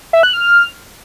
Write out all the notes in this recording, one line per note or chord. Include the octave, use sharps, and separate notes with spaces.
E5
F#6
F6